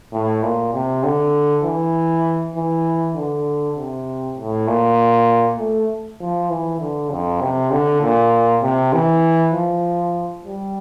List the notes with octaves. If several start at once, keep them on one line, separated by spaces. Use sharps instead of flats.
A2
A#2
C3
D3
E3
E3
D3
C3
A2
A#2
A3
F3
E3
D3
F2
C3
D3
A#2
C3
E3
F3
G3